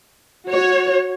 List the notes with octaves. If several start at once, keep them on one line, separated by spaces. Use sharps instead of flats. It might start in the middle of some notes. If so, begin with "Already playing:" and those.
F#4 C#5